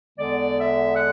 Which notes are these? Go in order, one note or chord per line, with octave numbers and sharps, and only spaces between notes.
E2 D3 G#3 B3 D5
E5
F#5